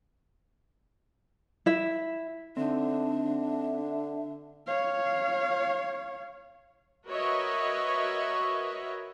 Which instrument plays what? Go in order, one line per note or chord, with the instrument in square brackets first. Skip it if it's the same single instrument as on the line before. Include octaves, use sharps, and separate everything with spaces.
[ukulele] E4 E5
[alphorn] D3 [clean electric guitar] C4 D#4 [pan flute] D4 [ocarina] E5
[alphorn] D3
[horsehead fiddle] C#5 F5
[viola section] F#4 A#4 B4 C#5 D#5 E5